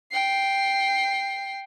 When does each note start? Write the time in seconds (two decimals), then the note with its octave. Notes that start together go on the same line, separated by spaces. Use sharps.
0.11 G5 C7